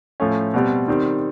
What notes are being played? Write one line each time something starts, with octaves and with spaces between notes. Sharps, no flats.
A2 F3 A3 C#4
B2 G3 C4
D#3 G3 C4